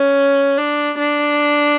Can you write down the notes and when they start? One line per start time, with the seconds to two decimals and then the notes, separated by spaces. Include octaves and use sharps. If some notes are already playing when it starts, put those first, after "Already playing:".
Already playing: C#4
0.58 D4
0.98 D4